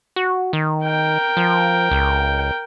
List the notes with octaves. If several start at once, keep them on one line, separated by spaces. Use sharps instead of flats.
F#4
D#3
A#4 G5
F3
C#2